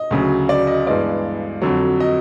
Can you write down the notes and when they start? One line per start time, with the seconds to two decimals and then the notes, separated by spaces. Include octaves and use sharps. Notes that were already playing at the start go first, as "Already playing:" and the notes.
Already playing: D#5
0.11 D2 C#3 F#3
0.49 D5
0.67 D#5
0.86 G2 E3 G#3 B3 D5
1.62 F2 D3 F#3
2.00 D#5